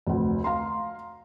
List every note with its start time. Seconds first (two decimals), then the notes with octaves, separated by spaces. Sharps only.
0.07 F1 D2
0.44 F5 A#5 C6